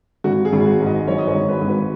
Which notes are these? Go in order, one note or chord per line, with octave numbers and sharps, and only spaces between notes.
G#1 F#4
G#4
G#1
G#4
F#4
G#2
D#5
F#3 C#5
D#5
C#5
G#1
B4
G#1
B4